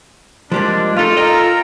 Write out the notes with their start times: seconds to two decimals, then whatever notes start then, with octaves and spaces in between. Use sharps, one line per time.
0.52 F3 G3 G#3 A#3 D4
0.97 G#3 A3 D#4 F4 A4
1.17 A#4 D#5 G5 A#5